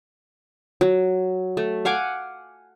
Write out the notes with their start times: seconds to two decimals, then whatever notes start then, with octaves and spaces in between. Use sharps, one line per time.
0.81 F#3
1.57 A3
1.85 F5 F#5 G#5 D6